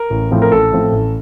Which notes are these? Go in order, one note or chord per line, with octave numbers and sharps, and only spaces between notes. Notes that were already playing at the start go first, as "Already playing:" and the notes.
Already playing: A#4
A1
A2 F3 C4
A#4
A1 A4
A2 F3 C4
A1